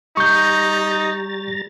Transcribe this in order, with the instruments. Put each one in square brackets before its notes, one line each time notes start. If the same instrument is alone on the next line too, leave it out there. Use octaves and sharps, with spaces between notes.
[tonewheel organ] G3 A#5 A6 [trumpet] D#4 [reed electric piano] C#6 G6